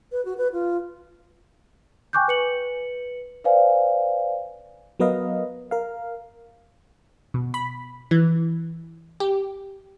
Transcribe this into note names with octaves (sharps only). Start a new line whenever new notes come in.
B4
F#4
B4
F4
G5 G#5 C#6 D6 F#6 G6
B4 C#7 F#7
B4 C5 D5 F5 G#5
F#3 B3 A#4 B4 D#5 F5
A#4 F5
B2
B5
E3
G4